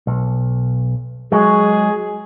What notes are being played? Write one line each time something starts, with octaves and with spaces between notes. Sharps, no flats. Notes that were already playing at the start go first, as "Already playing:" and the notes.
B1
F#3 G#3 G#4